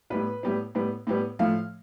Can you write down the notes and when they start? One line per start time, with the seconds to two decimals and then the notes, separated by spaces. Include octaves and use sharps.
0.10 A2 G3 B3 B4
0.43 A2 G3 B3
0.75 A2 G3 B3
1.07 A2 G3 B3
1.39 A2 F3 A3 F5